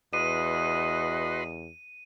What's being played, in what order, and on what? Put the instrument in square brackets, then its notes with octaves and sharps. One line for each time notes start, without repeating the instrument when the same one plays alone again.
[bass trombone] E2 [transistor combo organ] F#4 B4 C6 [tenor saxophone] D#5 [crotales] D#7